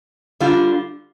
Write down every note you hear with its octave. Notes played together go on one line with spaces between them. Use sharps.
D3 G3 D4 F4